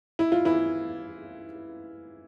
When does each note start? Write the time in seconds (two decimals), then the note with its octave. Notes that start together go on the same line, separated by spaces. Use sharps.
0.19 E4
0.32 F4
0.45 E3 E4